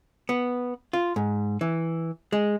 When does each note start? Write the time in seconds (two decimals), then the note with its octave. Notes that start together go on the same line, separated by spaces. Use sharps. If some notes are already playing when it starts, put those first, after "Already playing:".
0.29 B3
0.93 F4
1.16 G#2
1.61 E3
2.32 G#3